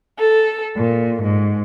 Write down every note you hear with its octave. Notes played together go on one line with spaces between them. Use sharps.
A4
A#2
G#2